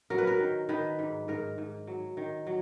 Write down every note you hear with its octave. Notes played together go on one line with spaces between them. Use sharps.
F#3 A#4
B4
A#4
D#3
D#3 B4
G#2
G#2 A#4
G#2
F#3
D#3
F#3